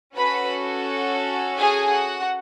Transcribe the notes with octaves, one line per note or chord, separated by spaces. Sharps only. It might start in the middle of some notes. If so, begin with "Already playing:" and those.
C#4 F#4 A4 B4 B5
G#4 G#5
F#4 F#5